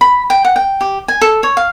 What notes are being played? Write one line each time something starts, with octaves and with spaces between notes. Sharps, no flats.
B5
G5
F#5
G5
G4
G#5
A4
C#5
F5